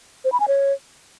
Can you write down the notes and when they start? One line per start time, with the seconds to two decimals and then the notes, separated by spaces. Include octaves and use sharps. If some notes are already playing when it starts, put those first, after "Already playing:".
0.25 C5
0.32 B5
0.40 G#5
0.48 C#5